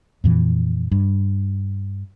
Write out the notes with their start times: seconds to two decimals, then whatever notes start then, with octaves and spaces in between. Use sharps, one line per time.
0.24 F2 A#2 E3
0.91 G2